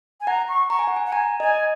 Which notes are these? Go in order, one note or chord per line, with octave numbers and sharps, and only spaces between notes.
G#5
F#5 A#5
C#6
A#5 C#6
G#5
F#5
G#5
F#5
G#5 A#5
D#5 G#5